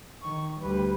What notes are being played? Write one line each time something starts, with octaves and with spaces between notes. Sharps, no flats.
D#3 C#6
D2 G3 B4